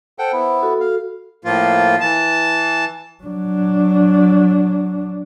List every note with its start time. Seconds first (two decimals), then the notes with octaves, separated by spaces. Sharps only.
0.19 A4 C5 F#5 G5
0.33 B3 E4
0.62 F#4 A4
0.80 F5
1.45 A2 F3 A#3 F4
2.01 E3 A5
3.23 F#3 D4